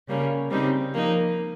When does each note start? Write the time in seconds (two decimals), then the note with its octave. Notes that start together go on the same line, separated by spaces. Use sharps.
0.08 C#3 G3 A#3 C#4
0.50 C#3 G3 C4 D#4
0.92 F3 A#3 D#4